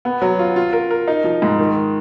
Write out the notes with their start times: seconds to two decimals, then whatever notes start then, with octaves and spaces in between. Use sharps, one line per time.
0.05 B3
0.22 F#3
0.39 F4
0.56 F4
0.73 A#4
0.91 A#4
1.08 D#4
1.24 F3
1.42 G#2
1.59 D#3